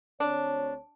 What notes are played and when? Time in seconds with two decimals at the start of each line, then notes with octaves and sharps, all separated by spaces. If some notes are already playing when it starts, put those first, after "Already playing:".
0.20 D2 C4 D4 C#5